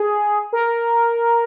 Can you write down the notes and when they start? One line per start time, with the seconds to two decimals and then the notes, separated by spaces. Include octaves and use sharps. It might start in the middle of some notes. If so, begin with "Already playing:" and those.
Already playing: G#4
0.53 A#4